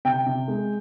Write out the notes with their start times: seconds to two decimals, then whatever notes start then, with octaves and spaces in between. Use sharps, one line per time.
0.05 C3 G5
0.26 C3
0.48 G#3